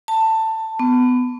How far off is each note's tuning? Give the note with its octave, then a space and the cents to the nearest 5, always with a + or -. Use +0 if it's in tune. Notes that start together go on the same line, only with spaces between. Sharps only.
A5 +15
B3 +20